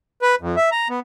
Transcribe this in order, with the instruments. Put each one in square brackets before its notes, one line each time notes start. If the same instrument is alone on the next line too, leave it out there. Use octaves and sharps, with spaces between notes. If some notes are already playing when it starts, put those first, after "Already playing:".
[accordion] B4
F2
E5
A#5
B3